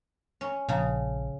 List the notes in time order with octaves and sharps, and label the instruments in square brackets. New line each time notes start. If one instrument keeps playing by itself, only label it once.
[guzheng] C#4
[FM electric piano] A#1 [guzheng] C#3